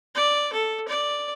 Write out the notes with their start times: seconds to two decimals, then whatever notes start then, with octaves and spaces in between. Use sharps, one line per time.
0.15 D5
0.53 A4
0.88 D5